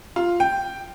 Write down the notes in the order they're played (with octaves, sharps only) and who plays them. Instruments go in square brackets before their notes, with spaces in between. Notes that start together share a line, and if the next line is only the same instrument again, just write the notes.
[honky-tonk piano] F4
G5